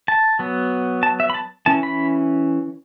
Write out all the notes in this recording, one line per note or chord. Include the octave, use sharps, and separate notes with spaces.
A5
F#3 B3
A5
E5
B5
A5
E3 C#4 A5
B5